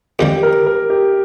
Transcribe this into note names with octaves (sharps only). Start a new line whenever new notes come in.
F2 D#3 G3 G4
A#4
A#4
G4